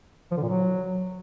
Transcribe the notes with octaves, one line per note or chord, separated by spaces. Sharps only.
F3
D3
A#2
F#3